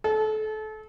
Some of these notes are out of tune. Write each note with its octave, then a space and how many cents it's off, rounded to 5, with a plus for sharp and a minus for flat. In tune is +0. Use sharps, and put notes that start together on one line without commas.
A4 -30